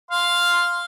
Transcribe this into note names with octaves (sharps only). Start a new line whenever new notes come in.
F5 C6